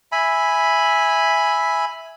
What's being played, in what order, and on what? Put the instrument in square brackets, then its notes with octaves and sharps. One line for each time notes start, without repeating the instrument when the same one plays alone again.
[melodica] E5 G#5 B5